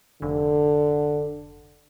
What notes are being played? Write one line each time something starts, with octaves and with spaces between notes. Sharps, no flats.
F1 D3